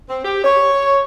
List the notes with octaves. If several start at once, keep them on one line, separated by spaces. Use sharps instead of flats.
C4
G4
C#5